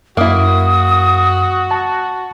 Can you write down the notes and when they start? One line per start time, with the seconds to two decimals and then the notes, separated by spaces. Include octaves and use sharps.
0.17 F#2 A#3 E4 F#4 D#6
1.71 A5